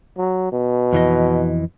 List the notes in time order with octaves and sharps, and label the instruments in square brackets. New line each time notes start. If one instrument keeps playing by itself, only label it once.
[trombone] F#3
B2
[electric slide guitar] F2 E3 D#5